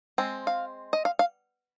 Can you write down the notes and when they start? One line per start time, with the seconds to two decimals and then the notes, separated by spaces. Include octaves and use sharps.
0.18 G#3 C4
0.47 F5
0.93 D#5
1.05 F5
1.19 F5